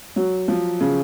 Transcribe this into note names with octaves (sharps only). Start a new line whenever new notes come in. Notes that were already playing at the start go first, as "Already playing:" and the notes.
F#3
F3
C#3